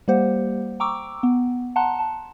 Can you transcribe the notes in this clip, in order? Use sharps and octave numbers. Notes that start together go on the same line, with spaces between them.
G3 A#3 G4 C5 F#5
G5 A#5 C#6 D6 E6 D7
B3
F#5 A5 A#5 C6 F#6
A5